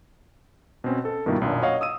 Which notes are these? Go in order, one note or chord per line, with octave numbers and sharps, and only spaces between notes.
B2 C4 C#4
A4
G2 B2 D#3 A#3 B3 E4
B1 F#2 A#2 D4
C#5 D#5 F5 F#5
D#6 E6 D#7